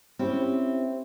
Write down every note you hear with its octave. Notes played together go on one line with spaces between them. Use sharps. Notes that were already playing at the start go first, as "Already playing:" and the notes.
C4 C#4 E4 G4